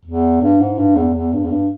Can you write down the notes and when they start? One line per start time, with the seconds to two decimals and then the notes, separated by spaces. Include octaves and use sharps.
0.05 E2
0.42 G2
0.60 G#2
0.78 G2
0.96 E2
1.14 E2
1.33 G2
1.44 E2
1.50 G2